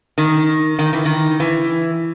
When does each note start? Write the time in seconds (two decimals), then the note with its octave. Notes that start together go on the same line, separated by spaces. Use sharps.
0.18 D#3
0.79 D#3
0.93 E3
1.05 D#3
1.40 E3